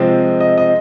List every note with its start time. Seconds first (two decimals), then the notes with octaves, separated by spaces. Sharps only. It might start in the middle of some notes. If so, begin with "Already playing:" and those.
Already playing: C3 F3 G#3 C4 D#5
0.40 D#5
0.58 D#5